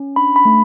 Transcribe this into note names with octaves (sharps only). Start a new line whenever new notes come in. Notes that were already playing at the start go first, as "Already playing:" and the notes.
Already playing: C#4
D4 B5
B5
A3